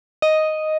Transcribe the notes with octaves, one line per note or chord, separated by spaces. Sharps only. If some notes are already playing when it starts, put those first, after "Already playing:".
D#5